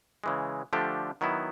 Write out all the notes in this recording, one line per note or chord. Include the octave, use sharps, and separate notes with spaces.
C#3 E3 G#3
D3 F3 A3 D4 G4
D#3 F#3 B3 E4